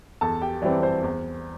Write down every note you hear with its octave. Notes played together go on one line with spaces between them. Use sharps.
E2 A4 A5
G4 G5
E3 G3 C4 D5
C5
E2